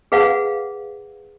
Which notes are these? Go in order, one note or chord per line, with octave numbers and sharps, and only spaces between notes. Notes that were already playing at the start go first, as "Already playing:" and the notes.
G#4 B4 F5 F#5